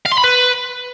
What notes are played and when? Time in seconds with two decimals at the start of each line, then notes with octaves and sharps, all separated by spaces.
0.06 F5
0.12 C6
0.18 B5
0.24 B4